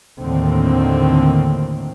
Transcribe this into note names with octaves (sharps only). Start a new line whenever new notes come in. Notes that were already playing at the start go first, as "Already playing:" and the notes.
D#2 A2 D3 D#3 C4